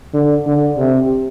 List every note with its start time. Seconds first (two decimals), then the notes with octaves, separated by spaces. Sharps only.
0.14 D3
0.47 D3
0.77 C3